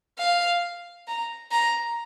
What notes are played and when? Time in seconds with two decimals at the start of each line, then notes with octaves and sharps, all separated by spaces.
0.19 F5
1.08 A#5
1.52 A#5